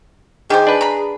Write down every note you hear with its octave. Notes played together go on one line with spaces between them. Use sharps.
D#3 G4 G#4 C5
D4 B4
A#5 B5